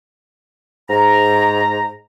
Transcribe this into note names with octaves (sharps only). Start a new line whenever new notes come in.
G#2 A#5